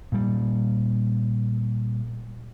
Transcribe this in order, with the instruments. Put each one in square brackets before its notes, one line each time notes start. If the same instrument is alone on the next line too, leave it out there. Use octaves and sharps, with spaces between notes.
[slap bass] A#2 G3